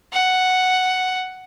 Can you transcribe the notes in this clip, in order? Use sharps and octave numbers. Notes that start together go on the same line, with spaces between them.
F#5